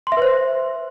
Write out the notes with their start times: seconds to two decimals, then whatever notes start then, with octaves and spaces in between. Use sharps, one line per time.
0.07 C6
0.12 E5
0.17 B4
0.22 C5